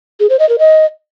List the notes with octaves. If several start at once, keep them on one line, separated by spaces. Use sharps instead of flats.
G#4
C5
D#5
A#4
D#5